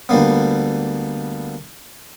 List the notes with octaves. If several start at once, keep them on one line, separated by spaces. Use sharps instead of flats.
D2 G3 A#3 B3